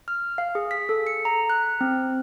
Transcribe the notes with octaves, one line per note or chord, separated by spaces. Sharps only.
F6
F5
G#4
B6
A4
C#7
A#5
F#6
C4